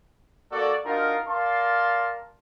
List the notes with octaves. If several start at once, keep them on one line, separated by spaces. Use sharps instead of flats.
A#3 F#4 A4 D5
D4 D#4 F4 F#4 A#4
A#4 D5 F5 A5 C6